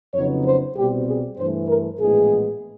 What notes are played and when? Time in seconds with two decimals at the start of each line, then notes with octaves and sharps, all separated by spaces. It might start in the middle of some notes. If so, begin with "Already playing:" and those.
0.14 F2 C#3 F#3 B3 D#4 C#5
0.45 C5
0.76 C2 B2 G3 C4 G4
1.07 G#4
1.38 G2 E3 A3 C5
1.69 A#4
1.99 A#1 A2 E3 G#3 B3 G#4